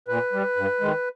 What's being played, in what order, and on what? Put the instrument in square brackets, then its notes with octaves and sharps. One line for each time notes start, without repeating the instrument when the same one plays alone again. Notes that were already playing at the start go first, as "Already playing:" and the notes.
[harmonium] A#2 B4
G3
G2
D#3 G#3